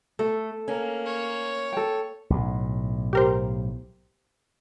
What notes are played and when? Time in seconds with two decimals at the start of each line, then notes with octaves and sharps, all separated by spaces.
0.19 A3 A4
0.68 A#3 C#4
1.06 C#5
1.73 A4 G5
2.30 B1 A2
3.13 G4 A#4 C5